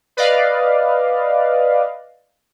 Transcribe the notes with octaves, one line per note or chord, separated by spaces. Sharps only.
B4 D5 D#5 F5